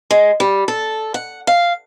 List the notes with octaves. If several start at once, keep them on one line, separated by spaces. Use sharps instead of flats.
G#3
G3
A4
F#5
F5